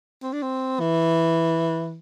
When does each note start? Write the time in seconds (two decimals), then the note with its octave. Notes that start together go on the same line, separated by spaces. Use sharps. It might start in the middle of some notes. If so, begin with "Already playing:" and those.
0.22 C4
0.33 D4
0.42 C4
0.80 E3